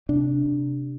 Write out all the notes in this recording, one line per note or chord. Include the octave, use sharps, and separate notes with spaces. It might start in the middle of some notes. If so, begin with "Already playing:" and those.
C3 D4
C3